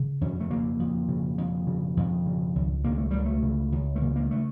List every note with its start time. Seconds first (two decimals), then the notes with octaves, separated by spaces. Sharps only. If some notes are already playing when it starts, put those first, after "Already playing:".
Already playing: C#3
0.21 F2 C#4
0.40 A3
0.50 C#3 A#3
0.80 F2
1.09 C#3
1.38 F2
1.67 C#3
1.97 F2
2.26 C#3
2.55 C#2
2.84 C#3 A#3
2.98 A3
3.11 C#2 G3
3.25 A3
3.43 C#3
3.72 C#2
3.95 A3
4.01 C#3 A#3
4.16 A#3
4.31 A3